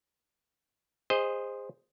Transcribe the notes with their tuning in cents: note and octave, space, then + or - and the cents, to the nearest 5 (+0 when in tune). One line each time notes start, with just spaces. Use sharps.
G#4 -30 C5 +0 D#5 +0